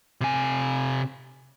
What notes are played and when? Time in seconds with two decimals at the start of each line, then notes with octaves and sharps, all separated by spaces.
0.21 C3 G#5